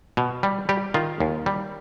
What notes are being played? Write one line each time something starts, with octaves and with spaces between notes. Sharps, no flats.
B2
G3
G3 G4
D#3 F4
D#2
G3